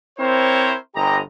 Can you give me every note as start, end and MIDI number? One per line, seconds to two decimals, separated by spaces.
0.18 0.74 60
0.18 0.74 64
0.18 0.74 70
0.18 0.74 72
0.18 0.74 73
0.95 1.17 31
0.95 1.17 67
0.95 1.17 75
0.95 1.17 82